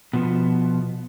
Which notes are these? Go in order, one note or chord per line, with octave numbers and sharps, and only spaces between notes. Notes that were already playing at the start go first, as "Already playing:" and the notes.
B2 F3 B3